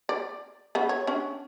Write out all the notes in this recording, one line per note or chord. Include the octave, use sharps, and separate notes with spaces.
D5
C#3 B3
C#5
C#4 D4